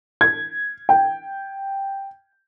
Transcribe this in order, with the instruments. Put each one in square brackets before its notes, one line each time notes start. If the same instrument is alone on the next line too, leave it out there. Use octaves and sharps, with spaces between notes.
[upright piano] G#6
G5